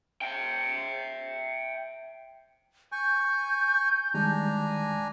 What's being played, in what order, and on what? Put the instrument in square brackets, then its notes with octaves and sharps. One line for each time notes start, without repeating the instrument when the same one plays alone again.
[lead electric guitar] E5 G5
[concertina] G#5 C#6 [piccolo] G6
[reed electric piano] D#3 G3 G#3 [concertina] D4 G#5 A#5